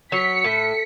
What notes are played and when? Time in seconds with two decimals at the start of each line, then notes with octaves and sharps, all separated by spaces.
0.12 F#3 B6 C#7
0.44 A2